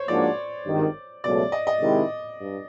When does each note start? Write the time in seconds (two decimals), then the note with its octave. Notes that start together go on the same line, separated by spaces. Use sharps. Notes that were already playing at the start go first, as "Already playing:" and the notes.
Already playing: C5 C#5
0.08 G#2 F3 A#3 D4 F#4 D5
0.66 G#1 G2 D#3
1.23 C#2 B2 F#3 A3 D5
1.52 D#5
1.67 D#5
1.81 C3 D#3 G#3 C4 E4
2.38 G2